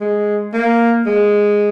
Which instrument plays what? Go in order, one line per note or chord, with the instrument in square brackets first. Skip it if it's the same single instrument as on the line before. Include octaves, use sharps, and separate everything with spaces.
[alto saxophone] G#3
A#3
G#3